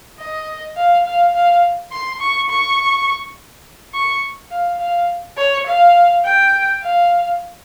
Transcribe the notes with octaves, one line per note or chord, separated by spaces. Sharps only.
D#5
F5
F5
F5
C6
C#6
C#6
C#6
F5
F5
C#5
F5
G5
F5